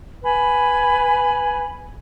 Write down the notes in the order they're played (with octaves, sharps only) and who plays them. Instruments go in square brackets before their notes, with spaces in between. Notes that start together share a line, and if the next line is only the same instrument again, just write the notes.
[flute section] B4 G#5 B5